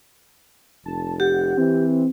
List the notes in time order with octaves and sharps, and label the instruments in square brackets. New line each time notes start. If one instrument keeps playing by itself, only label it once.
[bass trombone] F1 [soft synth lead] A5
[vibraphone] G4 [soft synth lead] F#5
[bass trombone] E3 [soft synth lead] C4